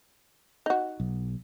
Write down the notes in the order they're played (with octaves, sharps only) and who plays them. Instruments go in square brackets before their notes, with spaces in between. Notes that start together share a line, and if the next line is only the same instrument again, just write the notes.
[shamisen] D#4 F#4
[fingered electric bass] B1